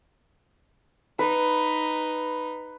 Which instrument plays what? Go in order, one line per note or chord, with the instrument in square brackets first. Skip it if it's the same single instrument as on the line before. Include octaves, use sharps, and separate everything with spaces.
[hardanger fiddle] D#4 [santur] B4